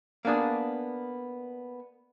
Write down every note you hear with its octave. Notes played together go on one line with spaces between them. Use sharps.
A#3 B3 D4 G#4